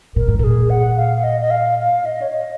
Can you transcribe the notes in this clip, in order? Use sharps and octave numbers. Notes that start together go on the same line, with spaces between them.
A#2 A#4
G#2
A#2 G#4 A#4
F#5
F5
D#5
D#5
F5
F5
D#5
C#5
D#5